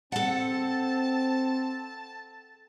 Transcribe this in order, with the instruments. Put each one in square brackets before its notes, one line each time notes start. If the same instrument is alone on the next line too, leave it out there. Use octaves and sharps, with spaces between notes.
[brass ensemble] C4 [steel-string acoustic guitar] A4 F#5 [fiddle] A5